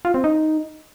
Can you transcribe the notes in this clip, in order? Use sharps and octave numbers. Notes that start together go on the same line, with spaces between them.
F4
C4
D#4